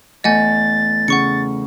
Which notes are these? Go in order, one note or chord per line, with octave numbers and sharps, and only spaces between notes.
E2 A3 D#5 F#5 G#5 A6
C#3 F#5 C#6 C#7